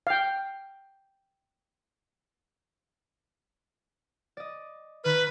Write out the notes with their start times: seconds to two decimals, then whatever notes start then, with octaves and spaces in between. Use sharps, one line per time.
0.07 F5 G5
4.37 D5 D#5
5.04 D#3 B4 F6